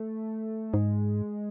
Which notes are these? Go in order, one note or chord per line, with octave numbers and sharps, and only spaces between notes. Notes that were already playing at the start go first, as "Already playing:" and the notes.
Already playing: A3
G#2 G#3